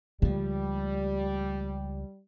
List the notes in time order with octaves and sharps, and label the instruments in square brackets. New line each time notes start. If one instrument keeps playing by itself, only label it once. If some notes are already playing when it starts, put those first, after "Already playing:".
[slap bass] C#2 F3 [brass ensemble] G3 [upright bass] A3